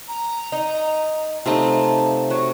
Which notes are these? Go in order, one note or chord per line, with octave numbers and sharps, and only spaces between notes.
A#5
D#4
C3 A3 D#4 F4 A5
F#3 C#6